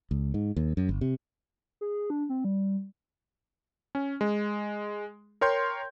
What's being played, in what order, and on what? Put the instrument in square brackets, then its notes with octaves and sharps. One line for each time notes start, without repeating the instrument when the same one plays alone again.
[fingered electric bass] C#2
G#2
D#2
F#2
G1
C3
[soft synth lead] G#4
D4
C4
G3
[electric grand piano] C#4
G#3
A#4 C#5 G5 C6 G6